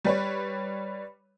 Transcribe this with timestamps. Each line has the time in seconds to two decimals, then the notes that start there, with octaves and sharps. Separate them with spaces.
0.04 G3 B4 C#5